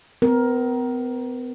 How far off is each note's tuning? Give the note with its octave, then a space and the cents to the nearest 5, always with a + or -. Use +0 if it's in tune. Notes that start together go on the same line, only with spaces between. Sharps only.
B3 +45 A#4 +15